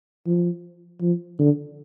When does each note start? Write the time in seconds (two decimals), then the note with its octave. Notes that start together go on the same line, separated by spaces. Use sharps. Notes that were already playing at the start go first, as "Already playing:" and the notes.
0.27 F3
1.02 F3
1.39 D3